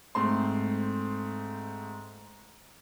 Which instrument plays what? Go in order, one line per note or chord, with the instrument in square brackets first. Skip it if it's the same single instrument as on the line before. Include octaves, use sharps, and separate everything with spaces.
[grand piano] G#2 A3 C4 C6